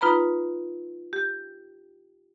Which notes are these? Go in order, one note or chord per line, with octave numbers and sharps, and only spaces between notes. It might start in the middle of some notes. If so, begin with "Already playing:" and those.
D#4 F4 B4 A#5 B5
G4